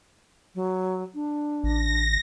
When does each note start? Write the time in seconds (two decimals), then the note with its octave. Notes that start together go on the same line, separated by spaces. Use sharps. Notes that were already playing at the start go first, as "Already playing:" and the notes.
0.55 F#3
1.14 D4
1.63 A1 A#6